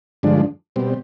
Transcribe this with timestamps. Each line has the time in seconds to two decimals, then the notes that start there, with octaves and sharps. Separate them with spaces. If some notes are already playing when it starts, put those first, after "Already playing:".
0.23 G2 D3 F3 G#3 D4
0.76 B2 G3 C4